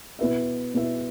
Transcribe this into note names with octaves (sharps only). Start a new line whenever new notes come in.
B2 B3 E4 B4 E5
B2 B3 E4 B4 E5